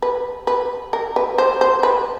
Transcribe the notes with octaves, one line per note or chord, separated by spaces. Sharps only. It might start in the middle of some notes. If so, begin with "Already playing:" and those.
B4
B4
A#4
B4
C5
C5
B4